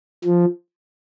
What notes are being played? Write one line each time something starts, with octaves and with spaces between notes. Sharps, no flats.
F3